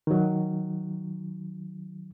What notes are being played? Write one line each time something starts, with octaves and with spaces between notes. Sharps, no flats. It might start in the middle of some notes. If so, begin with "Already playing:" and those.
D#3 F#3